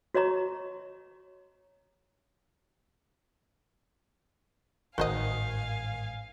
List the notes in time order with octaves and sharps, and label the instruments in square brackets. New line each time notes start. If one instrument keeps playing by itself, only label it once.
[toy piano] F#4 C#5 D#5 A#5 C#6
[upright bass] A1 G#2 [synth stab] D#3 [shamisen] F#4 C5 D#5 [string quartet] F5 G#5